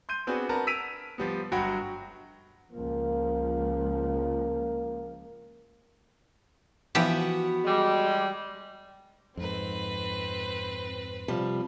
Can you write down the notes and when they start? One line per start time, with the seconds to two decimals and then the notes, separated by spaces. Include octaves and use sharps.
0.09 C6 G6 D#7
0.27 B3 C4 D4 F#4 G#4 B4
0.49 A#4 B4 F#5 A5 A#5
0.67 E6 B6 D7 D#7 F7
1.18 F3 G3 B3
1.52 G1 F#3 F#4 F#5 G5 B5
2.73 C#2 F3 A#3
6.95 E3 F3 B3 F#4 G4
7.65 G3 G#3
9.37 F2 G#2 C4 B4
11.28 C3 F3 G3